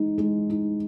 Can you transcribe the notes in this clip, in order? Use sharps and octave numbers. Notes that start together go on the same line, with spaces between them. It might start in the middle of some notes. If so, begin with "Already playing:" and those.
Already playing: G#3 D#4
G#3
D#4